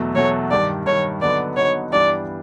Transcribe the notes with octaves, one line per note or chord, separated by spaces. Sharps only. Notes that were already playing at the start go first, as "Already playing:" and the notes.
Already playing: E2 B2 F#3 A3
E2 B2 F#3 A3 C#5
G2 D#3 G3 D5
G2 D#3 G3 C#5
D3 F#3 B3 D#4 D5
D3 F#3 B3 D#4 C#5
G2 E3 G3 B3 D4 D5